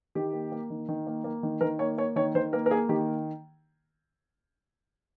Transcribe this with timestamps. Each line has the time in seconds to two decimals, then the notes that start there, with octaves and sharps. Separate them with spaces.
0.15 D#3 G4
0.33 A#3
0.52 A#3
0.70 D#3
0.89 D#3
1.07 A#3
1.24 A#3
1.43 D#3
1.61 D#3 A#4
1.79 A#3 C#5
1.98 A#3 C#5
2.16 D#3 C#5
2.35 D#3 C5
2.53 A#3 A#4
2.66 A#4
2.71 A#3 G#4
2.89 D#3 G4